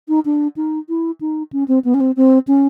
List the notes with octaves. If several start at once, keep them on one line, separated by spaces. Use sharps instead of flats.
D#4
D4
D#4
E4
D#4
C#4
C4
B3
C#4
C4
C4
C#4